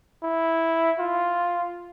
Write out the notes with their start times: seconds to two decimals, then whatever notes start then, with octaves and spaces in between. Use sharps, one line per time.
0.23 E4
0.99 F4